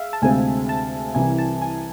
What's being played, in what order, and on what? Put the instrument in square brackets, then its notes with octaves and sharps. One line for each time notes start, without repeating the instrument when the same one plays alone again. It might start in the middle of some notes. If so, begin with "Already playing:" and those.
Already playing: [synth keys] G#4 E5 F5
A5
[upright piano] D2 C3 G#3 C4 [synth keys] G#5
[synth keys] A5
[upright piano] C2 C3 E3 [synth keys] G#5
[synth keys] A5
G#5